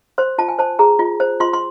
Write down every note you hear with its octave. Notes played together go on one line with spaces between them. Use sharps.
C5 C6
F4 A5
G#5
C5 A5
G#4 A#5
F4
C5
F4 C6
C6